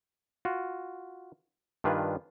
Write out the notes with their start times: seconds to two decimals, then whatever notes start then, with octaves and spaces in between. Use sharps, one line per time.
0.45 F4 F#4
1.84 G2 D#3 D4 F4 B4 G#5